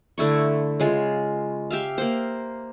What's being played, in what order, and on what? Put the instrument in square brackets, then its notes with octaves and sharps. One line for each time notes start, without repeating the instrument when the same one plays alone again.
[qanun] D3 A3 E4 C#6
C#3 G#3 F4
G4 E5 F5
A#3 C5